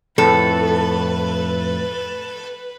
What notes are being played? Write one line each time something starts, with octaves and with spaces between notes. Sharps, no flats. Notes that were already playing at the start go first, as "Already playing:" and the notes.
F2 A2 A4 B4